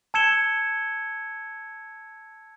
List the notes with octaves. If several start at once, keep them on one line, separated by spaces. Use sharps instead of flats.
A5 E6 G#6 C#7 E7 G7